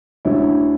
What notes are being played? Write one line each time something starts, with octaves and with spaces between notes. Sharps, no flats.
D2 D3 F#3 C#4 E4